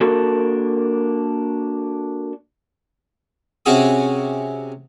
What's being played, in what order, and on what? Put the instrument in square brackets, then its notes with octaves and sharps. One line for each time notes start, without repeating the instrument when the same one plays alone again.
[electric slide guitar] A#3 D4 F#4 A4 A#4
[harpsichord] C3 C#4 F#4 G#4 D#6